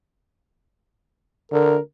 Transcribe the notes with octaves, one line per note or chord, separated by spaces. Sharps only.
D3 A#4